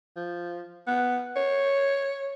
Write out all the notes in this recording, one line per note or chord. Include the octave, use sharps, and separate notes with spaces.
F3
B3
C#5